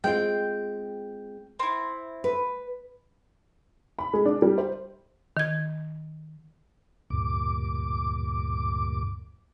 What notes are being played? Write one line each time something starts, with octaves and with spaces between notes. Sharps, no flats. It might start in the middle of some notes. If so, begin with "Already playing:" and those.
G#3 C4 F4 G5
C4 E4
B4
B5
G#3
D4
G3
C5
D#3 G#6
D2 G2 A#2 D6